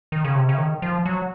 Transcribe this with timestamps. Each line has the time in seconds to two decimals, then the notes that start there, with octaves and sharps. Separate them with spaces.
0.12 D#3
0.25 C#3
0.35 C3
0.49 C#3
0.58 D#3
0.82 F3
1.05 F#3